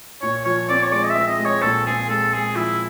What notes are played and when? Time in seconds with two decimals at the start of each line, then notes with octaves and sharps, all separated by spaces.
0.22 A#2 C#5
0.45 F3 C#5
0.69 C4 D5
0.84 C#5
0.92 G#3 D5
1.03 D#5
1.10 E5
1.16 C4
1.28 D#5
1.39 G#3
1.45 C#5
1.62 A#2 A4
1.86 C4 G#4
2.09 G#3 A4
2.33 G#3 G#4
2.56 F3 E4